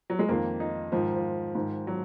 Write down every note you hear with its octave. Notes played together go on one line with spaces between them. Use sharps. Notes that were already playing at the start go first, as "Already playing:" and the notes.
F#3
G#3
F2 D#3 A#3
D#4
G#2 D#3 F3
F3
G#2 D#3
F#3